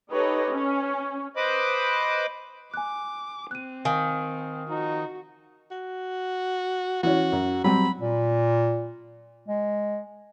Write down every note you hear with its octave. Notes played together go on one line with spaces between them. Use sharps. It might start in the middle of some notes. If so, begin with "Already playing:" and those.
D#4 G4 A4 B4 C#5 D#5
C#4
B4 C5 D#5 B5 D6
G#5 D6 F#6
C4 F#6 D#7
D#3 F5 G#5 D#6
F3 D#4 F#4
F#4
E3 C#4 F#4
F#2
F#3 G3 C4 B5
A#2
G#3